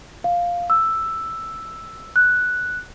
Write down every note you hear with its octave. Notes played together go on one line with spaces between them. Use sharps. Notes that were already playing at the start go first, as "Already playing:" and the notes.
F5
E6
F#6